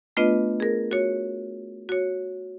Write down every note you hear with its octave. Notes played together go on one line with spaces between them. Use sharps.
A3 B3 D4 F4 B4 D#5
G#4 A#4
F#4 C#5
F#4 C#5